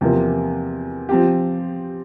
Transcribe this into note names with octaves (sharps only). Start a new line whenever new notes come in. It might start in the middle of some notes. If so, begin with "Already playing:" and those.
E2 C3 F3 A#3
F3 C4 G4